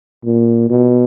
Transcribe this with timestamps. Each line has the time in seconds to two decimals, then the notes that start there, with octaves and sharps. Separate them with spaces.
0.25 A#2
0.71 B2